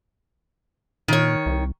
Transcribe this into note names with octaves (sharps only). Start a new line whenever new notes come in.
A#2 D#3 C#5
C2